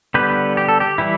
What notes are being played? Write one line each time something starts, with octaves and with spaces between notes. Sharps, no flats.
D3 G3 B3 G4 B4
G4
A4
G4
E3 G3 E4